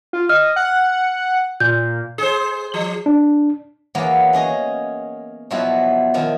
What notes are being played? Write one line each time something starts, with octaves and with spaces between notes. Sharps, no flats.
F4
D#5 F6
F#5
A#2 G6
G#4 C5
F3
D4
E2 F#3 A#3 B3
C#4 G#4 D#5
B2 F3 F#3 B3 E4
D#3 F3 E4